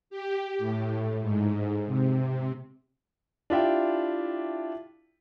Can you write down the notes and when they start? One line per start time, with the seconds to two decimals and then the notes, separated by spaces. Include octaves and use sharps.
0.10 G4
0.59 A2
1.21 G#2
1.87 C3
3.50 D4 E4 F4 G4 E5 G5